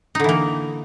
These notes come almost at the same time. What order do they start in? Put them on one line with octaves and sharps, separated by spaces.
D#4 D3 E3 A#3